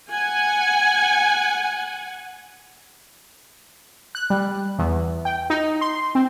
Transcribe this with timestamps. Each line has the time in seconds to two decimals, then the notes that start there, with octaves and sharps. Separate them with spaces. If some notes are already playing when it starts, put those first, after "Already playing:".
0.11 F#5 G#5
4.15 F#6
4.30 G3
4.79 E2
5.25 G5
5.50 D#4
5.81 C6
6.15 C4